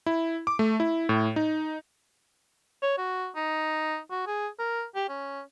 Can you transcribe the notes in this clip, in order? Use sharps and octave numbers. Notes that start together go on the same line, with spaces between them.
E4
D6
A3
E4
A2
D#4
C#5
F#4
D#4
F#4
G#4
A#4
G4
C#4